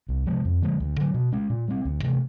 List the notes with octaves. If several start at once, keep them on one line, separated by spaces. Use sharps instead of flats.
C2
C3 F3 G#3
F2
D3 F3 G#3
D2
D3 F#3
B2
G#3 C#4
A#2
G3 C4
D2
C3 E3 A3